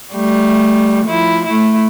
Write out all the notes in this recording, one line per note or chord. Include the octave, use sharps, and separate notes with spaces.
G3 A3
F3 E4
A3 E4